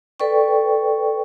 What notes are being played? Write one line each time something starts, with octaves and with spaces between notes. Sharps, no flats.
A4 B4 D5 G5 C#6